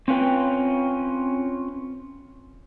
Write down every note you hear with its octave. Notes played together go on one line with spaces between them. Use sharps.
C4 C#4 F4 B4 G5